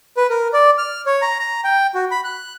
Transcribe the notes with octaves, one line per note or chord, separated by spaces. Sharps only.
B4
A#4
D5
F6
C#5
A#5
A#5
G5
F#4
B5
F#6